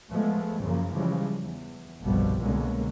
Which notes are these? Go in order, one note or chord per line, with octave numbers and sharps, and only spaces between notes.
F3 G#3 A3 B3
F#2 C#3 F3 A#3
C#3 E3 F3 G3 G#3
E2
G1 C2 B2 F3 G3
C2 B2 D3 G#3 A#3 C#4